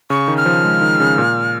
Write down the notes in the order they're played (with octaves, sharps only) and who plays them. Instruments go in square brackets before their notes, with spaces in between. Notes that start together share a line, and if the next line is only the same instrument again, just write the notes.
[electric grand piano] C#3 [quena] C#6
[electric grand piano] D#3
[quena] F6
[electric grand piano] F3
G#3
D#3
C#3
A#2